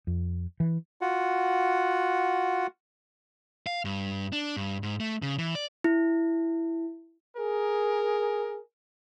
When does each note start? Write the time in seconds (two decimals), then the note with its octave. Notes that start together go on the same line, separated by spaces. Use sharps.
0.07 F2
0.60 E3
1.01 F4 F#4 F#5
3.67 F5
3.85 G2
4.32 D4
4.57 G2
4.83 G#2
5.00 A3
5.22 C#3
5.38 E3
5.55 D5
5.84 E4
7.37 G#4 A#4